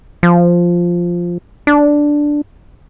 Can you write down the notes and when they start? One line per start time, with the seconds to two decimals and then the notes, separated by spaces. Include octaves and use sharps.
0.23 F3
1.67 D4